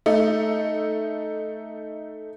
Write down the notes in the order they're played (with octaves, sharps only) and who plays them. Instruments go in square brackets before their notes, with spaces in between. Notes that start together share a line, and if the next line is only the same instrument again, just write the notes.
[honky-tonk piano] A3 D#4